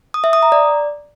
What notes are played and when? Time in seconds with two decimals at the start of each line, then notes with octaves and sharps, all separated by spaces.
0.14 D#6
0.24 E5
0.33 D#6
0.43 A#5
0.52 D5